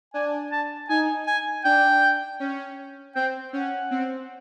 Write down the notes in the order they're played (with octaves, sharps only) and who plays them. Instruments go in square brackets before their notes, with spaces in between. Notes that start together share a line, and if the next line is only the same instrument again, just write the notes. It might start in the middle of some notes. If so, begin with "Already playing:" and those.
[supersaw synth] D4 [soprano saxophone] G#5
[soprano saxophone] A5
[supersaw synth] D#4 [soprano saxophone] G#5
[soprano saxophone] G#5
[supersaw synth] D4 [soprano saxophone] G5
[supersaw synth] C#4
[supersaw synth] C4 [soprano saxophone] G5
[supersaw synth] C#4 [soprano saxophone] F#5
[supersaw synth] C4